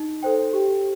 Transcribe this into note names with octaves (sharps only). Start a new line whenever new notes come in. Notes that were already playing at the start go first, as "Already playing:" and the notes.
Already playing: D#4
A4 C5 G5
G4